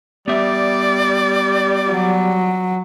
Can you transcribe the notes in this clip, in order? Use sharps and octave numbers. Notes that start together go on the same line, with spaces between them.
G3 B3 D5 E5
F#3